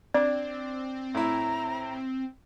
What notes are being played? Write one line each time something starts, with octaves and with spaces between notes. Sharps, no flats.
C4 D4 D5
A2 E4 A#5